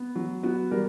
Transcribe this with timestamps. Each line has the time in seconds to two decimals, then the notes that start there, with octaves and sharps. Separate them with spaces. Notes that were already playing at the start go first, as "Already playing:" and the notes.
Already playing: B3
0.15 F#3
0.43 B3 F#4
0.71 G3 A#4